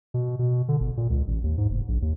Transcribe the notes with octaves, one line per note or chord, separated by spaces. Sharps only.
B2
B2
D3
G1
A#2
C#2
A1
D#2
G#2
F1
A#1
D#2